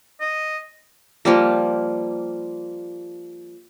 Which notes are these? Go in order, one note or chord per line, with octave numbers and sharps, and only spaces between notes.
D#5
F3 G3 A#3